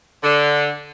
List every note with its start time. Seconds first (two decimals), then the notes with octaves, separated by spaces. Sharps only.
0.23 D3